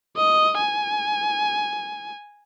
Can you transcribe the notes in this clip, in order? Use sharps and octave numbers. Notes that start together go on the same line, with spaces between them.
D#5
G#5